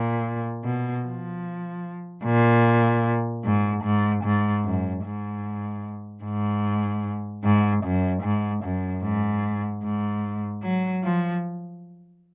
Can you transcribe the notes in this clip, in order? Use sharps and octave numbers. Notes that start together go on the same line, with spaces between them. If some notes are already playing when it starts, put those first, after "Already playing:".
Already playing: A#2
B2
F3
A#2
G#2
G#2
G#2
F#2
G#2
G#2
G#2
F#2
G#2
F#2
G#2
G#2
F#3
F3